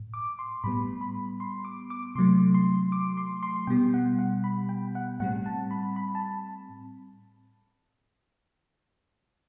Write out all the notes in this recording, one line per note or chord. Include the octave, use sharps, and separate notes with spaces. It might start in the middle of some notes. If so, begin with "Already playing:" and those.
Already playing: A2
D6
C6
A2 G3 B3 B5
B5
C6
D6
D6
C3 F#3 A3 C6
C6
D6
C6
C6
B2 G3 B3 G5
F#5
F#5
B5
G5
F#5
A2 G3 C4 F#5
A5
B5
B5
A5